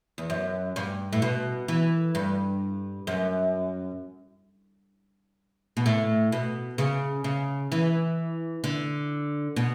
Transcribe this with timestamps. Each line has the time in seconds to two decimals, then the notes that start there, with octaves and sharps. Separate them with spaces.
0.18 E2
0.30 F#2
0.76 G2
1.13 A2
1.22 B2
1.68 E3
2.15 G2
3.07 F#2
5.77 B2
5.86 A2
6.32 B2
6.78 C#3
7.24 C#3
7.72 E3
8.64 D3
9.56 B2